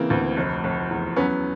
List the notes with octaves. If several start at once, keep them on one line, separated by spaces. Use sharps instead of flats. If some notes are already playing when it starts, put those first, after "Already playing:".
Already playing: C#3 E3 A#3 C4
D2
F1
F1
E2
F#3 B3 C#4